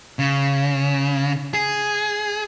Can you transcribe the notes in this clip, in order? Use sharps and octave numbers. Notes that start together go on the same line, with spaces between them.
C#3
G#4